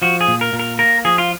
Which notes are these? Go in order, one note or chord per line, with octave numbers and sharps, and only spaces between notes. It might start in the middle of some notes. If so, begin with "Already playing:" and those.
F3 F#4
G#4
A#2
A#4
A#2
A#4
A#3 A#4
F3 G#4
F4